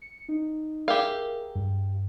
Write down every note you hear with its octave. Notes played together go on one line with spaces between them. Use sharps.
C#7
D#4
G4 G#4 A#4 E5 F5
G2